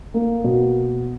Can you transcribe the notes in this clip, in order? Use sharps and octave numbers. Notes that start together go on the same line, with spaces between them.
A#3
B2